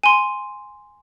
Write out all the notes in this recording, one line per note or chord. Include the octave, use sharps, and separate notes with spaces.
G#5 C6